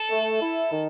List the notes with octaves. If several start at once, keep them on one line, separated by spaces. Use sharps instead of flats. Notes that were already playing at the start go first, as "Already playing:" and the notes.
Already playing: A4
A3
E4
D#3